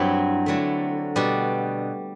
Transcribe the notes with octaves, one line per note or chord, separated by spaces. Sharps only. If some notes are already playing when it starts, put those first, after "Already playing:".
Already playing: G2 F#3 C4 E4
D3 F#3 A3
B2 G3 D4